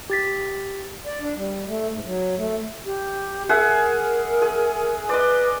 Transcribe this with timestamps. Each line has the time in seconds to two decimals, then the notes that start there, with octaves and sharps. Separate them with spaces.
0.10 G4 A6 B6
1.06 D5
1.20 D4
1.36 G3
1.68 A3
1.91 G#2
2.05 F#3
2.37 A3
2.85 G4
3.49 G#4 A#4 E5 F#5
4.42 G#4
5.09 B4 D5 D#5